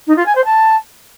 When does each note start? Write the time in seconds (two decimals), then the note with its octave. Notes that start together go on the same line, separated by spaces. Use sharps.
0.07 D#4
0.16 F4
0.25 G#5
0.35 C5
0.44 A5